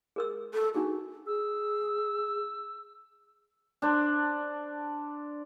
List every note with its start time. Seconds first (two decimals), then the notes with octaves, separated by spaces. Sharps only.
0.16 G#4 A#4 E6
0.53 A4
0.75 D4 D#4 F#4 G#4
1.27 G#4 E6
3.82 D4 C5